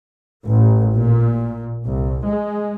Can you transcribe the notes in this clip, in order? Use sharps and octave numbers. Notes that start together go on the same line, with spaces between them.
A1
A#2
C2
G#3